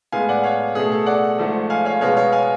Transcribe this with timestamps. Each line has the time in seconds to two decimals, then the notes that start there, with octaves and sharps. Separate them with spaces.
0.12 A2 G#3 B3 F5 G#5
0.29 D5 F#5
0.43 C#5 F5
0.75 B2 A3 G#4
0.91 A4
1.06 D5 F#5
1.38 G#2 F3 A3
1.70 F5 G#5
1.85 C#5 F5
2.01 B2 G#3 B3 C#5 F5
2.17 C#5 F5
2.32 F5 G#5